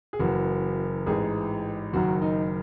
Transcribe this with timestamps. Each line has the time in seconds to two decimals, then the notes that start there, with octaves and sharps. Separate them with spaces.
0.13 G#4
0.19 F#1 F#2 E3 F#4
1.06 A1 G#2 E3 G#4
1.93 F#1 F#2 D#3 F#4
2.22 D#4